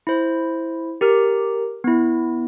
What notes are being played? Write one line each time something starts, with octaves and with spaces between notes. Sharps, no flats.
E4 C5
G4 A#4 F6
B3 E4